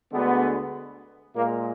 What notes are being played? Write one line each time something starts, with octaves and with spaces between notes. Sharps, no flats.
D2 D3 G#3 B3
A#2 G#3 A#3